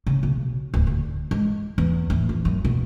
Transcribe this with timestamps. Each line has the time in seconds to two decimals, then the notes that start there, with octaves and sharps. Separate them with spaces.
0.07 C#3
0.23 B1
0.74 D1
0.87 D3
1.31 G#3
1.78 E2
2.10 A2
2.29 F2
2.45 F#2
2.65 B2